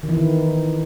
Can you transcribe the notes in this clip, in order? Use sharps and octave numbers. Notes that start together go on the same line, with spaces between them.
D#3
E3
D#3